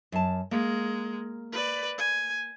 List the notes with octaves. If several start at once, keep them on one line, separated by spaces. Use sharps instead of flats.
F#2 A5
G#3 A#3
B4 D5
G#5